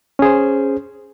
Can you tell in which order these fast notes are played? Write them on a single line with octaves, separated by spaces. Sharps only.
C#4 G#4 C5